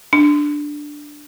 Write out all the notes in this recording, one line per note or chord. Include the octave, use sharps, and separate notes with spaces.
D4